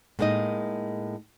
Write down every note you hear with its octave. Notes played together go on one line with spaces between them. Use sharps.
A2 G#3 A#3 D#4 D#5